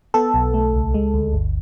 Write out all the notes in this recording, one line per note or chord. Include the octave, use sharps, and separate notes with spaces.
B3 A4
B1
A3
C#2
G#3
D2
G1